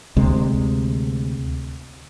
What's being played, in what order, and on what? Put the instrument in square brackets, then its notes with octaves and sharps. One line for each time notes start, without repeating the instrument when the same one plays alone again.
[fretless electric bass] D2 C3 G#3